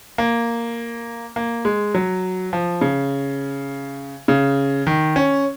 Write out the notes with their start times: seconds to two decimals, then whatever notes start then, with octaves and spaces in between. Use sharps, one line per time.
0.18 A#3
1.36 A#3
1.65 G#3
1.95 F#3
2.53 F3
2.81 C#3
4.28 C#3
4.87 D#3
5.16 C#4